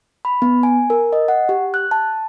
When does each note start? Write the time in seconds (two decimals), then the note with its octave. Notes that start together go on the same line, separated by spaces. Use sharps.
0.25 B5
0.42 B3
0.63 G#5
0.90 A#4
1.13 D#5
1.28 F#5
1.49 G4
1.74 F#6
1.91 A5